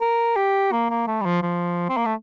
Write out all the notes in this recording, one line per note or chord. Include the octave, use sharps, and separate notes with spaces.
A#4
G4
A#3
A#3
A3
G3
F3
F3
C4
A#3
A3